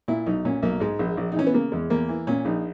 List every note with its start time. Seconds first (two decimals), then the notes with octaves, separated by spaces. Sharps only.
0.08 A#2 E4
0.26 B1 D#4
0.45 A#2 C#4
0.62 B1 A#3
0.80 G#2 G#3
0.99 A#1
1.17 A#1
1.32 D#4
1.36 E3 C#4
1.47 B3
1.54 C#3 A#3
1.72 E2 G#3
1.90 E2 A#3
2.09 E3
2.27 A#2 C#4
2.45 A#1 D#4